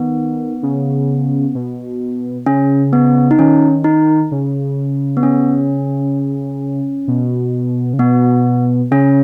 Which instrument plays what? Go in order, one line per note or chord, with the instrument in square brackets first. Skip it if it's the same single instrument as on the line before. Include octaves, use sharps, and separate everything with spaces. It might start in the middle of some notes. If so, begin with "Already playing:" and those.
Already playing: [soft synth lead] D#3 [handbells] B3
[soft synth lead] C#3
B2
[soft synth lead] C#3 [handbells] C#4
[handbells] B3
D#4
[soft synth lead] D#3 [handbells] C#4
[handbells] D#4
[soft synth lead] C#3
[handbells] B3
C#4
[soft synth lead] B2
C#3
[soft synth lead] B2 [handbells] B3
[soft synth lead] C#3 [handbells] C#4